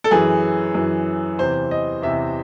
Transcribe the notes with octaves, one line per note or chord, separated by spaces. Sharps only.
A4
F#2 E3 G#4
F#2 E3
E2 C3 E3 C5
D#5
E2 C3 E3 E5